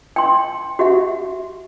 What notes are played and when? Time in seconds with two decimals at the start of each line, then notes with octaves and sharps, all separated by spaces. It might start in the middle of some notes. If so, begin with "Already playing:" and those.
0.16 G5 C6
0.79 F#4 G4 E5 F#5